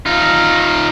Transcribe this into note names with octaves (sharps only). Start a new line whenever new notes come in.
D#4 F4